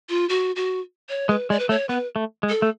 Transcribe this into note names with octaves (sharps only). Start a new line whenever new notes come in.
F4
F#4
F#4
C#5
G#3 B4
G#3 D5
B4
A3 C#5
B3 B4
A3
G#3
A4
A3